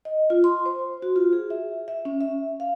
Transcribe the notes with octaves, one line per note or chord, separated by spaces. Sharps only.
D#5
F4
C6
C5
F#4
F4
G#4
E5
E5
C#4
E5
F5